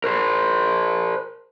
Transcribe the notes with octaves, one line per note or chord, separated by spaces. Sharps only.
A#4 C5